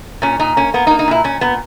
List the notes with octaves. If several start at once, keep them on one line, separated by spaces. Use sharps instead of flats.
A#2 C#4
A#2 D#4
A#3 C#4
A#3 B3
D#4
A#3
D#4
A#2 E4
A#2 C#4
A#2 B3